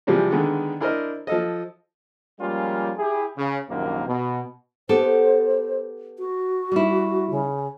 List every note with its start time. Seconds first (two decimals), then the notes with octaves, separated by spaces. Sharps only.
0.07 C3 E3 F3 G3 G#3
0.31 D3 D#3 G#3 B3 D4
0.80 D4 E4 A#4 C5 D#5
1.27 F3 A4 D#5
2.40 F3 G3 G#3 A#3 C#4 F4
2.98 E4 G4 G#4
3.37 C#3
3.69 A#1 F#2 C3 D#3 A#3
4.07 B2
4.89 B3 G4 A4 C5
6.19 F#4
6.72 G3 E4
7.30 C#3